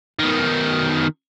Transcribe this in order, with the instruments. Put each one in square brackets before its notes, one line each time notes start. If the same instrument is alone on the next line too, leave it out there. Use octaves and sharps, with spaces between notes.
[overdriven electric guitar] B2 D#3